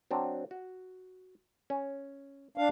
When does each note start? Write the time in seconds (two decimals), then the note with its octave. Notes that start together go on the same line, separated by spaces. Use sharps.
0.11 F#3 C4 D4
0.51 F#4
1.70 C#4
2.58 D4 F5